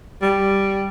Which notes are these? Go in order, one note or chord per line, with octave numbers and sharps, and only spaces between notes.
G3